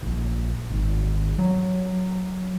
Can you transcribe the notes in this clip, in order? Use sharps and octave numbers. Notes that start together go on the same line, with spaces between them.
A#1
G#1
F#3